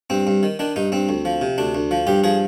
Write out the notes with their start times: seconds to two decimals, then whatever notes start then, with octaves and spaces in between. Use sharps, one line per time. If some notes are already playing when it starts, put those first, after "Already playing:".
0.10 G2 C4
0.27 G2
0.43 D#3
0.59 D#3 D4
0.76 G2 D#4
0.92 G2 C4
1.09 D2
1.25 F3
1.41 C3
1.58 D2 D4
1.75 D2
1.91 F3
2.07 G2 G4
2.24 F3 G#4